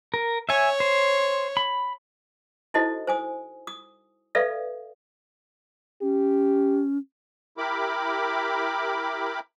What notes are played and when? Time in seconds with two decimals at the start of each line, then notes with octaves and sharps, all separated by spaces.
0.14 A#4
0.49 C#5 E5 G#5
0.80 C5
1.57 B5
2.74 D#4 E4 F#4 A4 C5 D#5
3.07 C5 G#5 D#6
3.67 D#6
4.35 A4 B4 D5 E5 F5
6.02 C#4 G4
7.58 E4 G4 A#4 B5 D6